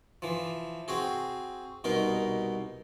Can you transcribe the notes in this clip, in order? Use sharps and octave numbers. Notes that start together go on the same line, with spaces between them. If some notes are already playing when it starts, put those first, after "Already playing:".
E3 F3
C4 F#4 G#4
C2 B2 D#4 A#4